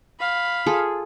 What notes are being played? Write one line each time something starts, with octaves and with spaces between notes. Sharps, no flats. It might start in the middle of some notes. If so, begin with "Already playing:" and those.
F5 B5
F4 G#4 A4